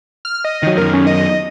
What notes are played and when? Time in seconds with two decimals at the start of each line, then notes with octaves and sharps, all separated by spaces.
0.25 F6
0.44 D#5
0.63 D#3 F#3
0.77 F#2 D#3 A#4
0.93 C#4
1.07 D#5